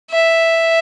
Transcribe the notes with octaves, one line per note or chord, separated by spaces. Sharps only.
E5